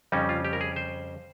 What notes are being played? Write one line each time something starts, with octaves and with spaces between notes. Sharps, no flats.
F2 C#3 G3 C#4 D#4
F4
G4
A#4
G#4
C5